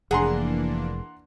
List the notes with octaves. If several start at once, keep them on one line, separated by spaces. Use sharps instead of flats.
F1 E3 A#3 D4 G#4 F#5 A#5 C6